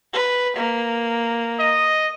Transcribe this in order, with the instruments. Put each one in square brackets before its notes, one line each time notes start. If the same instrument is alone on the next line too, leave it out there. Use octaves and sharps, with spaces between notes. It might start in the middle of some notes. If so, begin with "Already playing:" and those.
[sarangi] B4
A#3
[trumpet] D#5